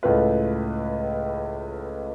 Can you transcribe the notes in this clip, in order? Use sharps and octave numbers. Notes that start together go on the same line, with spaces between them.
C#2 A2 A3 F4 B4